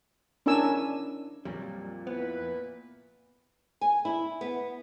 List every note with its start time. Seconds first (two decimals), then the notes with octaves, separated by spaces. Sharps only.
0.46 C#4 D4 E4 A#4 G#5 E6
1.45 F2 A#2 F#3 G3
2.07 B3 E4 B4
3.81 G#5
4.05 E4
4.41 B3